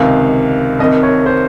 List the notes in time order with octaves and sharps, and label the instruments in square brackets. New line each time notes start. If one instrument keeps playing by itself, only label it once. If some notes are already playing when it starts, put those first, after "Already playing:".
Already playing: [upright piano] C#2 C3 D#3 F5
C2 C3 D#3 D#5
C#5
C5